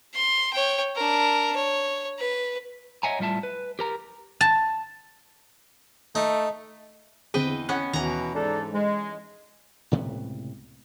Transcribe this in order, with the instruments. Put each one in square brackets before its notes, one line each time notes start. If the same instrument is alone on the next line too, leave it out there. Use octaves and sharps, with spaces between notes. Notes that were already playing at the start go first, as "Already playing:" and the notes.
[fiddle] C6
C#5 G5
D4 A#4
C#5
B4
[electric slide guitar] C#5 D#5 E5 F#5 G#5 A#5
A2 G3 F4 E5 A5
B4
G4 A#4 A#5
[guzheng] A5
[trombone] A3 [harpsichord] D#4
[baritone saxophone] E2 [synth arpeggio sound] D3 C4 G#4 [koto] B4 D#5 G5
[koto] B3 C#4 [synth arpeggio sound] F#5 F#6
[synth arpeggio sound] D#2 D#3 [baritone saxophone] B2 [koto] E3 A#5
[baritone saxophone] G#2 [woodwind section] D4 D#4 A4
[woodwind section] G#3
[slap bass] C#2 A2 C3 B3